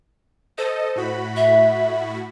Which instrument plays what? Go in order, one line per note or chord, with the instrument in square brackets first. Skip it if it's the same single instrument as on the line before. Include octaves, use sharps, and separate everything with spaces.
[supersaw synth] A4 D#5 [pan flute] C5
[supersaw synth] A2 F#4 B5
[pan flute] E5